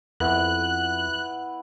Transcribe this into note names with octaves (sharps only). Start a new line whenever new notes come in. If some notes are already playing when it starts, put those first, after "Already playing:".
F2 B3 E4 B4 F#6